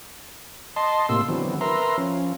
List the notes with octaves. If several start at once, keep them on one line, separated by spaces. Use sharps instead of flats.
D#5 A5 C6
A2 C3 A#3 C6 E6
D3 E3 F#3 B3 C4
A#4 B4 E5 A#5 C6
F3 C#4